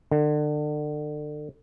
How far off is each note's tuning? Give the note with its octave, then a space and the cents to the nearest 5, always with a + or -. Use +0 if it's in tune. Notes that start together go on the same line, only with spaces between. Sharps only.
D3 +30